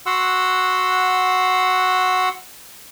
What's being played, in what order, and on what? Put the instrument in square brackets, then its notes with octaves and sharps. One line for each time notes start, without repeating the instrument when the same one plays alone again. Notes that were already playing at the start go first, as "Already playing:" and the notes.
[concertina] F#4 F#5 C6 E6